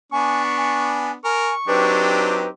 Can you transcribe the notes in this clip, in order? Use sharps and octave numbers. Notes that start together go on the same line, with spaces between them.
B3 D4 G#5 C#6
G#5
A#4 G#5 C#6
F#3 C4 D4 D#4 G4 B4